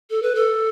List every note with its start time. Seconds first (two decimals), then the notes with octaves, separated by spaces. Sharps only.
0.10 A4
0.22 B4
0.35 A4